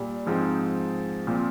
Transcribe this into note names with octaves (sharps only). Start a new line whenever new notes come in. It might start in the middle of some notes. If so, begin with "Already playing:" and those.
Already playing: A#2 G3
G#2 F3 G#3 C4 D#4
A#2 F3 C4